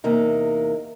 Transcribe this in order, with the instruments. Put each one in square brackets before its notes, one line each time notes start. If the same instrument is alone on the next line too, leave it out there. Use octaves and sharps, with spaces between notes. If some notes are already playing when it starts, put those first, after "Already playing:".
[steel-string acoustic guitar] E2 C3 A#3 D#4